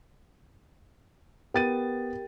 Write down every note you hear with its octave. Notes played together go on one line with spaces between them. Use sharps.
B3 G4 A#4 G5 A6 D#7